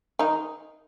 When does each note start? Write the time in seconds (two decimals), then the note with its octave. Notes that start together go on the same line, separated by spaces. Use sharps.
0.19 D#3 D#4